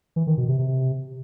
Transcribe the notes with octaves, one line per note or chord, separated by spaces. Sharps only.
E3
D#3
B2
C3
C3